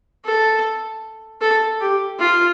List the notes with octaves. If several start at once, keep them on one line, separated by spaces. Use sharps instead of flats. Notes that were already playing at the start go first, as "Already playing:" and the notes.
A4
A4
G4
F4